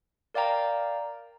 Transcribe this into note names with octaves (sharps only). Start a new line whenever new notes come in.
A#4 D5 F5 G5 A#5